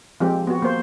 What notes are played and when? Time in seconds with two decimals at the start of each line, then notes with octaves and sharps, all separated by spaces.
0.20 F3 G#3 C4 G4
0.47 B3 F#4
0.62 A#3 C5